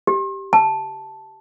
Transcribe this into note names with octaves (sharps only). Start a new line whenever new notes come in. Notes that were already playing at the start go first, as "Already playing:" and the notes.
G4
A5